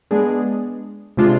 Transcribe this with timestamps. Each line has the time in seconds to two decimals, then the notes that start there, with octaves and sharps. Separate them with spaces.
0.11 G#3 B3 D4 G#4
1.17 C3 G#3 D4 F4